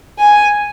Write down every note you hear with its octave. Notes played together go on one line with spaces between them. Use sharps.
G#5